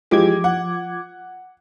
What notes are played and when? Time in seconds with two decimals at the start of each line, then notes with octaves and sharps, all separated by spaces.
0.11 E3 F3 G#3 G4 D6 G#6
0.44 F#5